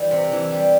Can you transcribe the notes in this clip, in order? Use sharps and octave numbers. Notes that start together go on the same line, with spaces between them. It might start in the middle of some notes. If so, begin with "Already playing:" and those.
Already playing: E3 G3
C3
E3
G3